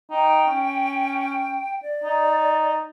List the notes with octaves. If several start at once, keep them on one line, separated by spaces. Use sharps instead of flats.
D#4 G5
C#4
D5
D#4